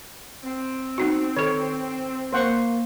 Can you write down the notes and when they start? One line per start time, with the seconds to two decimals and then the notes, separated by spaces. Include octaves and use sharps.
0.44 C4
0.98 B3 D#4 F#4
1.37 D#3 A4 C#5
2.33 A#3 C5 F#5 C#6